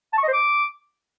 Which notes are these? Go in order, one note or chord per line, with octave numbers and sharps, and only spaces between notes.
A5
C#6
D#5
C5
D6